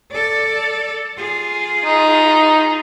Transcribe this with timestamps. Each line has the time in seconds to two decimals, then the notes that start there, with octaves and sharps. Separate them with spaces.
0.11 A4 D5
1.18 F4 G#4
1.85 D#4